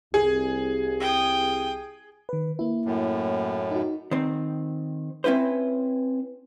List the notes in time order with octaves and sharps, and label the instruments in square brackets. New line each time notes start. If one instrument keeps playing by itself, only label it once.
[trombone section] C2 [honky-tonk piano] G#4
[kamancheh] G5 D#6
[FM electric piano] D#3 B4
A#3 E4
[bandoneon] F#2 A2
[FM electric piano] D#4 F#4
[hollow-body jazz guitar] D#3 C4
C4 C#4 E4 B4 C5